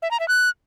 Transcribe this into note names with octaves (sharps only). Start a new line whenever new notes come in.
E5
A#5
E5
F#6